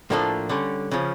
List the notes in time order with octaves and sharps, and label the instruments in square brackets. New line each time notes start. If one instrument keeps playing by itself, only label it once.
[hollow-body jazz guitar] A2 F3 A#3 D4 A4
D3 G3 C#4
C#3 F3 C#4